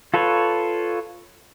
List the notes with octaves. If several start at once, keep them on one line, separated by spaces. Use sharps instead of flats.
F4 A4 B4 C#5